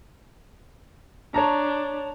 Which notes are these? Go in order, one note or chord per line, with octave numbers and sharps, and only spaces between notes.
D4 C#5 A5 A#5